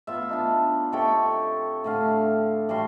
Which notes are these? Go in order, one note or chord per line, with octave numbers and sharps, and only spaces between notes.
B3 F4 E5
B3 D4 D#4
C3 A4 C#5 G5
A2 D3 F5
A2 G3 F#4 C6